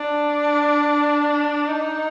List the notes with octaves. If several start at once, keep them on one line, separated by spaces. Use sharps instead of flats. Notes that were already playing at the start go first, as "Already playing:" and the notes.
Already playing: D4
D#4